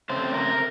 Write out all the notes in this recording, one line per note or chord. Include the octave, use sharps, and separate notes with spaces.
C#3 A3 C4 C5
A#4